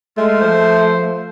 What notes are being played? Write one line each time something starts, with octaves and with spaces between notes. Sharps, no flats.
G#3 A3 F4
F3 C5